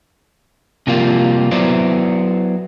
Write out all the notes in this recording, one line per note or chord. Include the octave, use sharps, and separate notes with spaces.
C3 F3 G3 A#3 F4
F#3 B3 E4 C5 D5